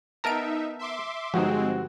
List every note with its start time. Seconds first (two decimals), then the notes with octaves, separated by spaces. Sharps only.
0.24 B3 D#4 A#4 E5 A5 A#5 D7
0.79 E5 C6 D6
1.34 G1 F3 G#3 C4 D#4 F#4